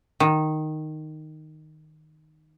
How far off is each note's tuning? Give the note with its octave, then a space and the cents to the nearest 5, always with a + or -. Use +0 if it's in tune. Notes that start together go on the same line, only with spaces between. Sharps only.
D#3 -5